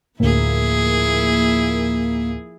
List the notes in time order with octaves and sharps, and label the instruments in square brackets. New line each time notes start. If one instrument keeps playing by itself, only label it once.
[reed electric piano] D2 A2 [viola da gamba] F3 E4 G#4 [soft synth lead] A#3